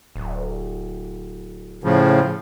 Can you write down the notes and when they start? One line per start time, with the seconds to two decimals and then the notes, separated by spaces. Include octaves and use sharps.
0.16 D1
1.84 A2 C#3 F3